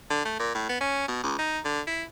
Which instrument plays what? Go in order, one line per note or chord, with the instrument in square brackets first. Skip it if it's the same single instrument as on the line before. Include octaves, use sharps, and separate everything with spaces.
[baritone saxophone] D3
A3
A#2
A2
B3
C#4
B2
C#2
D#4
D3
E4